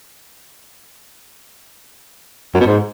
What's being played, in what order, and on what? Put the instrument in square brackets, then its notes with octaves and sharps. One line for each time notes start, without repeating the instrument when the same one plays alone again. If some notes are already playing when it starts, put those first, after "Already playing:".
[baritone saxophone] F#2
B2
G#2